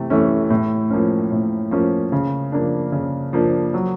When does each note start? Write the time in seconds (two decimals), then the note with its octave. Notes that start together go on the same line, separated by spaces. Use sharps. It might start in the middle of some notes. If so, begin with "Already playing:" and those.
Already playing: C3 E3 A3
0.10 E3 A3 C#4
0.50 A2
0.90 F3 A#3 C#4
1.32 A2
1.71 F3 A#3 C#4
2.12 C#3
2.52 F3 A#3 D4
2.92 C#3
3.33 F3 A#3 D4
3.74 F#3